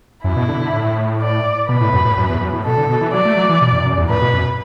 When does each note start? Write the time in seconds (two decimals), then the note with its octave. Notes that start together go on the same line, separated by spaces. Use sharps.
0.24 F#2 E4
0.36 B2
0.48 D3
0.61 D3
0.73 A2
1.21 D5
1.69 B2 B4
1.81 A2
1.93 F#2
2.05 A2
2.17 F#2
2.30 E2
2.41 F#2
2.53 A2
2.64 B2 A4
2.77 D3
2.90 B2
3.01 E3
3.13 F#3 D5
3.25 A3
3.37 F#3
3.49 E3
3.61 B2
3.73 F#2
3.85 F#2
3.97 E2
4.09 A2 B4
4.22 B2
4.33 F#2